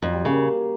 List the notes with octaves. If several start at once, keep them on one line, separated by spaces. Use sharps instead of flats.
F2 F#3
G3
C#3 A#3